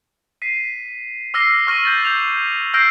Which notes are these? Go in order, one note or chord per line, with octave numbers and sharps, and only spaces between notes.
B6 C7 D#7
D6 E6 F6 A#6 C7 G7
C#6 F6 A#6 D#7 F#7
G6 A6 F#7
G6 E7 F7
E6 F6 G6 A#6 C7 D7